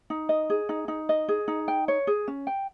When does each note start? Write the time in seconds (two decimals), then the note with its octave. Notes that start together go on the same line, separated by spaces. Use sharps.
0.10 D#4
0.29 D#5
0.50 G#4
0.69 D#4
0.88 D#4
1.09 D#5
1.29 G#4
1.48 D#4
1.68 G5
1.88 C#5
2.07 G#4
2.28 C#4
2.47 G5